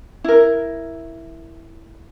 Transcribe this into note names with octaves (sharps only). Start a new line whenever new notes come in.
E4 A#4